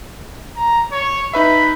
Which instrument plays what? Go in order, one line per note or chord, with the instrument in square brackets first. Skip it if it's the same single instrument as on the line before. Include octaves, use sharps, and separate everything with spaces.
[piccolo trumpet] A#5
C#5
[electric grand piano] D#4 B4 E5 [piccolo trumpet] B5